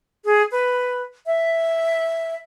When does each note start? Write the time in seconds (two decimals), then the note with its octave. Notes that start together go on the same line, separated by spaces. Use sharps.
0.25 G#4
0.52 B4
1.26 E5